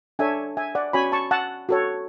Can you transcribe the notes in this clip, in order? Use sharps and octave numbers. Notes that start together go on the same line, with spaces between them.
D4 A4 C#5 E5 G#5
E5 G#5
D5 F#5
C#4 F#4 C#5 G#5 B5
A5 C#6
F#5 A5
F#4 A4 C#5